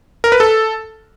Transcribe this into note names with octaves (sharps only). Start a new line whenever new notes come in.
A#4
B4
A4